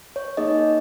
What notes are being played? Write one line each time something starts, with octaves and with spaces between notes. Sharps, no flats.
C#5
A#3 D#4 G#4 D#5